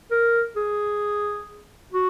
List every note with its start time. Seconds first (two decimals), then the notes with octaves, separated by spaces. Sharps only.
0.11 A#4
0.56 G#4
1.93 F#4